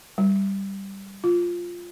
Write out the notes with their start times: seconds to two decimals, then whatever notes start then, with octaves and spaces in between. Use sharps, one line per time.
0.18 G3
1.24 F4